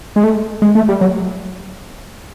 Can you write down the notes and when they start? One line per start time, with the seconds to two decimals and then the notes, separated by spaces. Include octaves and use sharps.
0.16 G#3
0.24 A3
0.62 G#3
0.75 A3
0.89 G3
1.01 F#3